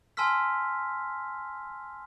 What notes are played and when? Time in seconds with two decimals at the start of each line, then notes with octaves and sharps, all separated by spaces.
0.17 G#5 A5 C6 E6 F6 B6